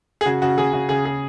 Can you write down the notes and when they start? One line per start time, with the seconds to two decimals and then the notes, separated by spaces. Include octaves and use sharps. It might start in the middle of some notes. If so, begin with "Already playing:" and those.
0.21 G#4
0.26 C#3 F#4
0.42 C#3 F#4
0.58 C#3 G#4
0.73 C#3 F#4
0.89 C#3 G#4
1.05 G#4